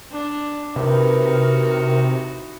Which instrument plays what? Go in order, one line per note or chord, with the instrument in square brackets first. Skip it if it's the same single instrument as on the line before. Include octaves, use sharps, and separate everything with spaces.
[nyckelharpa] D4
[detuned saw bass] C3 [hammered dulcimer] E3 [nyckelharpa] D#4 F#4 [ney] A#4